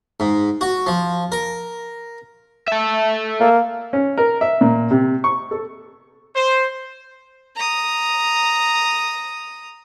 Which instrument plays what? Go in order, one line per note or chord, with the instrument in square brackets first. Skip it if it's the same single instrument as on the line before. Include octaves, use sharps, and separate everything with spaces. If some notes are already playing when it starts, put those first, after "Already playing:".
[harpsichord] G#2
F#4
F3
A#4
[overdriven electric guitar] A4 E5
[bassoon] A#3
[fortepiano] C#4
A#4
E5
A#2
C3
C#6
A4
[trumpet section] C5
[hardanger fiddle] A#5 D#6